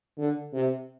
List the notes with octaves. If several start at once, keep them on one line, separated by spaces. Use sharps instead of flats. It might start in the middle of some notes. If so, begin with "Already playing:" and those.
D3
C3